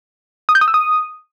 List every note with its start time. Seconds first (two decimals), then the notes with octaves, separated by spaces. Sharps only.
0.49 D#6
0.55 G6
0.61 D#6
0.68 E6
0.74 D#6